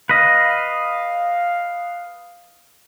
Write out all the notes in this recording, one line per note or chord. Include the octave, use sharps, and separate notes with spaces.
B4 D#5 F5